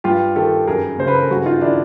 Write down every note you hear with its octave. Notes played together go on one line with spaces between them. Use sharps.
G2 F4 G4
D#3 G4 A4
F#2 G#4 A#4
C#3 C5
B4
A#4
A4
G2 F#4 G#4
D#4 F4
D#3 D4 E4